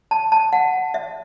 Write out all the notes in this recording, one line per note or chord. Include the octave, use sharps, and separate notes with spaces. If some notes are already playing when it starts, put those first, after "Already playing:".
A5
A5
F#5
E5